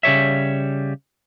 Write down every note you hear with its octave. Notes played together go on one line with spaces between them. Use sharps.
C#3 G3 C#5 E5